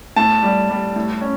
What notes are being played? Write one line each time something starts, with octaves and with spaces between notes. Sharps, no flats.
A2 A5
G3
G3
A2
C#4